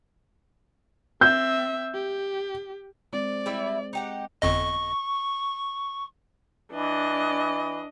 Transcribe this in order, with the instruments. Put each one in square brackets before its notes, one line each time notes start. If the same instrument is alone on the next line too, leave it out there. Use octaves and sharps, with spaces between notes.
[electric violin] C4 E5 [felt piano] G6
[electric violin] G4
[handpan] G#3 C4 [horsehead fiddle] D5
[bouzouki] G3 E4 E5
D#4 G4 F#5
[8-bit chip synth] G1 F2 D#5 [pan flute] C#6
[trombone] E3 [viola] D4 D#5